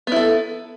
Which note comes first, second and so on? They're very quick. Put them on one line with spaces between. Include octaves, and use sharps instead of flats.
B3 E4 A4